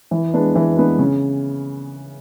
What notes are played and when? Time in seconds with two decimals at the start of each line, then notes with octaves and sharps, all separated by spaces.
0.11 E3
0.33 G#3 B3 D4
0.55 E3
0.77 G#3 B3 D4
0.99 C#3